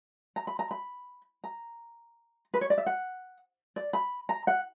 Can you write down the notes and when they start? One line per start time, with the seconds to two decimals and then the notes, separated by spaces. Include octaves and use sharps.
0.36 A#5
0.47 B5
0.59 A#5
0.71 B5
1.44 A#5
2.54 B4
2.61 C#5
2.70 D5
2.78 E5
2.86 F#5
3.76 D5
3.93 B5
4.29 A#5
4.47 F#5